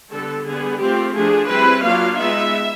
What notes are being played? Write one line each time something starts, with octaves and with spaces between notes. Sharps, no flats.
D3 G3 B3 A4
D3 G3 B3 G#4
A3 C4 F4 G4
F3 A3 D4 G#4
G3 C4 E4 B4
F#3 A#3 D4 F4 F5
G#3 B3 D#4 E5